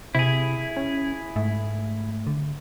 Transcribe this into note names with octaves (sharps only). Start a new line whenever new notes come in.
C3 E4 G#4
C#4
G#2 A3
D3